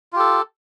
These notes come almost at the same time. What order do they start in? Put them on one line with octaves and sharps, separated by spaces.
F4 G4 A4